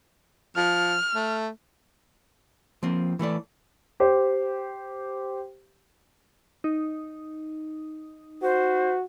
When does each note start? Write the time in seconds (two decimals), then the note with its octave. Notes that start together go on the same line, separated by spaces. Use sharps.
0.57 F3 F6
1.15 A3
2.83 F3 A#3 C4
3.19 E3 A3 A4 D5
4.00 G4 C5
6.64 D#4
8.43 F#4 C5